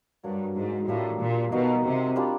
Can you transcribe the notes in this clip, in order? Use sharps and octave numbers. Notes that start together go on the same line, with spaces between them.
G2 F#3 A#3 D4
G#2
A2 G3 A#3 D4 F4
A#2
B2 D#4 F#4 A#4 D#5
C3
G3 A#3 D4 F4